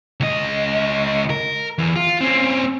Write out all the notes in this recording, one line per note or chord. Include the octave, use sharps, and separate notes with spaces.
C#2 D#5
A#4
E2
F4
C4 C#4